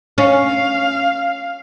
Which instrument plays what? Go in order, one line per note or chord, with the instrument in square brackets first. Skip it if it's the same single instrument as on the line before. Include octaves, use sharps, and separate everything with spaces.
[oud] C#4 [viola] F5